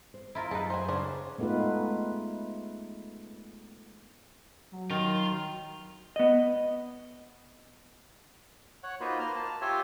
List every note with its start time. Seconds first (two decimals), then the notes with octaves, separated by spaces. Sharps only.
0.14 C5
0.35 E4 F4 A#4
0.51 F#2 D#4 G#4 B4 A5
0.70 C5 G#5
0.88 C#3 C#4 D4 C5
1.38 G#3 A3 B3 D#4 F4 B4
4.72 F#3
4.90 D#3 F4
6.16 B3 D#5
8.83 C#5 F#5
9.00 A#3 D#4 F4 F#4 B4 C5
9.19 A#3 A#5 C6 F6
9.36 A5
9.61 F4 G4 C#5 E5 G#5 C6